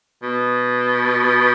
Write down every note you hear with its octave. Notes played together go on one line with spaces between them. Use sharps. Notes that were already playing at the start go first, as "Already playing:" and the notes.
B2